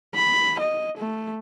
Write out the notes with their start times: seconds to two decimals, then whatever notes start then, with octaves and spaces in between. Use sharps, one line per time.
0.15 B5
0.59 D#5
0.98 A3